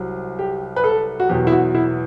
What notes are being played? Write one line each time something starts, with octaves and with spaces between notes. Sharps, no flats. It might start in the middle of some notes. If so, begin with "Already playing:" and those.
Already playing: C2 C3 F#3
G4
B4
A4
F#4
E2 B2 F#3 G4
E4
F#4
E4